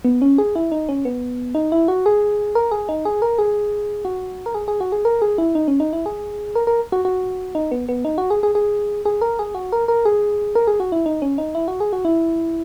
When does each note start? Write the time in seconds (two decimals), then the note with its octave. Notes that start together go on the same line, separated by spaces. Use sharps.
0.05 B3
0.22 C#4
0.38 G#4
0.56 E4
0.72 D#4
0.89 C#4
1.05 B3
1.55 D#4
1.72 E4
1.88 F#4
2.06 G#4
2.55 A#4
2.71 G#4
2.89 D#4
3.05 G#4
3.22 A#4
3.39 G#4
4.05 F#4
4.46 A#4
4.55 G#4
4.68 G#4
4.80 F#4
4.92 G#4
5.05 A#4
5.22 G#4
5.38 E4
5.55 D#4
5.68 C#4
5.80 D#4
5.93 E4
6.06 G#4
6.55 A#4
6.67 A#4
6.92 F#4
7.05 F#4
7.55 D#4
7.71 B3
7.89 B3
8.05 D#4
8.18 F#4
8.30 G#4
8.43 G#4
8.55 G#4
9.05 G#4
9.21 A#4
9.39 G#4
9.55 F#4
9.72 A#4
9.88 A#4
10.05 G#4
10.55 A#4
10.67 G#4
10.80 F#4
10.92 E4
11.06 D#4
11.22 C#4
11.38 D#4
11.55 E4
11.68 F#4
11.80 G#4
11.93 F#4
12.05 E4